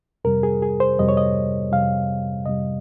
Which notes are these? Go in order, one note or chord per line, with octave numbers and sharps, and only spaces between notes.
F2 C3 G3 A#4
G#4
G#4
C5
F2 C3 G3 D#5
C#5
D#5
F2 C3 G3 F5
F2 C3 G3 D#5